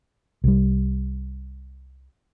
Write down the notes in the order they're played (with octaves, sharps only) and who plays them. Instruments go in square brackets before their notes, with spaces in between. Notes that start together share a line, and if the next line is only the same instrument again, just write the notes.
[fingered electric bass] C2 G3